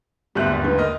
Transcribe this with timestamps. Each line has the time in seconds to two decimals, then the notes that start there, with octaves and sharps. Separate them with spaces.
0.35 G1 D#2 G#2 G3 B3 G4 E5 F#6
0.51 F4 D5
0.64 G2 B4
0.78 A#3 D#5 F6